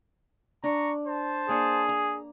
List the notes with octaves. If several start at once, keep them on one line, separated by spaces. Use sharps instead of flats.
D4 A#5 C#6
C5 A5
A#3 D4 G#4 C#5
A#5